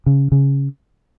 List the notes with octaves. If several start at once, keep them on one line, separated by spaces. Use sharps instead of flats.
C#3
C#3